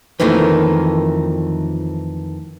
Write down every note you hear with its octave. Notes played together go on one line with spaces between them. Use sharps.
F2 D#3 E3 A3 A#3